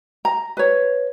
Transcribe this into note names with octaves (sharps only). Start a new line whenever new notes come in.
A#5
B4 C#5